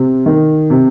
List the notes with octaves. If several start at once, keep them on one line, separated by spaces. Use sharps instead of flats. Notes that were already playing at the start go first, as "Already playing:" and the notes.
Already playing: C3
D#3
C3